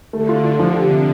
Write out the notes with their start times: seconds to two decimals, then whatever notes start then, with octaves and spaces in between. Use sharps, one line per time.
0.13 D3 A3
0.29 F4
0.44 F4
0.59 F3
0.75 G4
0.90 C3